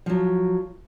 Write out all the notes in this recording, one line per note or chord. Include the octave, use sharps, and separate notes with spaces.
F3 F#3